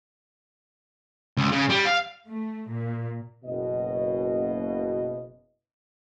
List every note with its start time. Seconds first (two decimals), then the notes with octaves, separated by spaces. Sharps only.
1.37 C#2
1.52 C#3
1.70 G3
1.87 F5
2.27 A3
2.69 A#2
3.45 F#1 B2 D#5